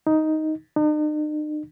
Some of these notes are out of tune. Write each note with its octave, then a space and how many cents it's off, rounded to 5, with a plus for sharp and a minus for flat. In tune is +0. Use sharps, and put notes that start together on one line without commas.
D#4 +5
D#4 -45